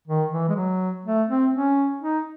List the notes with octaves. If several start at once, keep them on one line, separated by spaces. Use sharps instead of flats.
D#3
E3
G#3
F#3
A3
C4
C#4
D#4